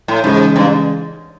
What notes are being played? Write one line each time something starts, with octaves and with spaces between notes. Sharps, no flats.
A2
G#2 C#3 E3 G#3
G2